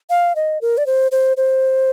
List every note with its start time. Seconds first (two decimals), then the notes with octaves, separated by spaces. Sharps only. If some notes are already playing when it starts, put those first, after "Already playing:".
0.10 F5
0.36 D#5
0.61 A#4
0.78 D5
0.86 C5
1.12 C5
1.37 C5